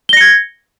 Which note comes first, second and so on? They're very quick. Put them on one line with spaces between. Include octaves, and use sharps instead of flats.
G7 A#6 C#7 G#6